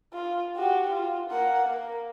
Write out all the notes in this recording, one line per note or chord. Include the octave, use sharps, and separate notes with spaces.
F4
F#4 G4
F4
A#3 F#5
A#3